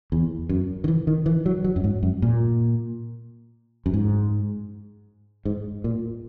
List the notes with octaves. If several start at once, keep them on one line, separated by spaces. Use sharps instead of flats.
E2
F#2
D#3
E3
D#3
E3
F#3
F#3
F#2
G#2
F#2
A#2
F#2
G#2
G#2
A#2